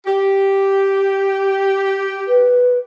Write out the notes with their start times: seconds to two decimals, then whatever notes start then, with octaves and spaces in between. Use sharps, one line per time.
0.06 G4
2.28 B4